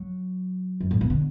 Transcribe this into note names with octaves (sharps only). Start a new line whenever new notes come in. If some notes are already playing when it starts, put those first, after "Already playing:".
Already playing: F#3
F#2
A2
B2
D3